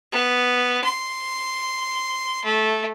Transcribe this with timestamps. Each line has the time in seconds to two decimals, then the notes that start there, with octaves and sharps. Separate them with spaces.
0.12 B3
0.84 C6
2.45 A3